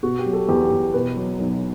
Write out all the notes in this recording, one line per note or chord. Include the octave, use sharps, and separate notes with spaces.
B2 F#4
G4
F#3
A4
E2 G4
E2
B2 B4
F#3
B1